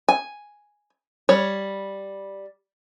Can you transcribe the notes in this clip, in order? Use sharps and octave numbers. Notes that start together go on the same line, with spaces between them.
G#5
G3 C#5